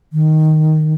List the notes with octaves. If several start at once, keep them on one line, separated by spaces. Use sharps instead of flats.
D#3